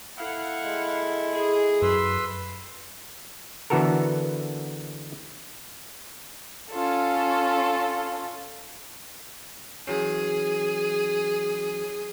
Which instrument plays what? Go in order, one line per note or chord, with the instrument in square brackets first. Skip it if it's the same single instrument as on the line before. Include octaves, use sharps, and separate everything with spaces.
[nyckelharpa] E4 A4 [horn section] F5 F#5
[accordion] G#3
[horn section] G#4
[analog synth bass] F#2 [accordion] B4 C6 E6
[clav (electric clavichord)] D3 E3 B3 F#4 A4 A#4
[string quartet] C#4 F4 A4
[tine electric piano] E3 F#3 C#4 [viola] G#4